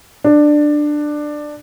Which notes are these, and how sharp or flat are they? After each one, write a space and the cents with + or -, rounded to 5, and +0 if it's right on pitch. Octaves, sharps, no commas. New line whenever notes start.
D4 +15